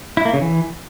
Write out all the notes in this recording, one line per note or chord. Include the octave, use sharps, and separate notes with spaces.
E4
A#3
C#3
E3